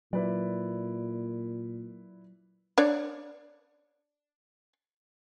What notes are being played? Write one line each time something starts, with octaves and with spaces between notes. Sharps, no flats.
A#2 F#3 E4 B4 D5
D4 C#5 D5